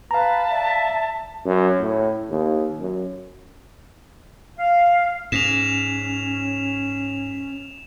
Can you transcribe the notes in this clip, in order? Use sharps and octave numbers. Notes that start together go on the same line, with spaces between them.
B4 F5 A5 A#5
D5 E5
F#2
A2
D#2
F#2
F5
G#2 C#4 E7 F7